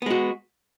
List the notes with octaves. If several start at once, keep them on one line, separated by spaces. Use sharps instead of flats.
G#3 B3 F#4